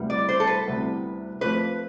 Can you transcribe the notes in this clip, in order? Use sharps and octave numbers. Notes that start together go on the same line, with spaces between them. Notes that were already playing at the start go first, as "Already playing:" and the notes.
Already playing: D2 C3 G3 B3 E4
D5
C5
A4
B4
D2 C3 G3 B3 E4
F3 A3 C4 F4 B4